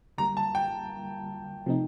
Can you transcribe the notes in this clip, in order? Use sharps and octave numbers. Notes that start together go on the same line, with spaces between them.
D3 G3 A#3 A#5
A5
G5
C3 F3 A3 C4 D#4